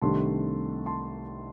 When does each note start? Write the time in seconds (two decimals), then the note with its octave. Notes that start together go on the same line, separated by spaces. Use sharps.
0.02 C2 C3 D#3 A3 D4 A5 C6
0.86 A5 C6